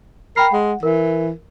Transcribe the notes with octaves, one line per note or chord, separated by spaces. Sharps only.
A#4 G5 B5 C7
G#3 F#5
E3 A#4